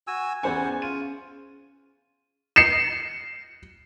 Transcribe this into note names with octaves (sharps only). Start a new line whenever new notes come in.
F#4 G#5 E6
E2 G3 C#4 G#4 C5 F#5 G#5
F4 D#7
C7 C#7 E7